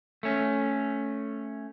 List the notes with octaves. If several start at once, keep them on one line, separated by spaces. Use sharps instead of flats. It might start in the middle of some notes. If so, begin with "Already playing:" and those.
A3 C#4